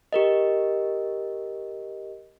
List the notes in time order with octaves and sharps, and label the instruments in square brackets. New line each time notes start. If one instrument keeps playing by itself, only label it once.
[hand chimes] G4 A#4 D#5